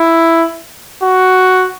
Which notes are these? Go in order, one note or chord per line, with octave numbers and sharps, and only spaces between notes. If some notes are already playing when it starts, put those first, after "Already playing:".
Already playing: E4
F#4